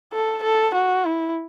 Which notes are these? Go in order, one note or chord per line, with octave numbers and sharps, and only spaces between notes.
A4
A4
F#4
E4